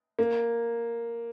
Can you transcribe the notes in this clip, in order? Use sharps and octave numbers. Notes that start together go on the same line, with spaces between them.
A#3